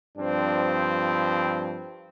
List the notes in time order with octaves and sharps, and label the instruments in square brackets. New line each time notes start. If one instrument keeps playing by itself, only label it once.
[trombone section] G2 F3 C4 D4